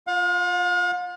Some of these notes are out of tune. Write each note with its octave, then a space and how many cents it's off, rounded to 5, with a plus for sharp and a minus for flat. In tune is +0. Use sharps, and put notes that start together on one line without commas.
F4 +0 F5 +45